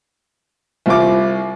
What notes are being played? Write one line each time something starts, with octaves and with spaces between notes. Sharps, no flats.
C2 E4 F4 D6